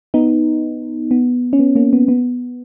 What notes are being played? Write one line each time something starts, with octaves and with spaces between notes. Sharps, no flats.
B3 D#4
B3
C#4
B3
A#3 C#4
B3
B3